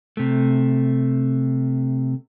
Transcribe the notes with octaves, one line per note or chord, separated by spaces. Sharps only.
C3 A3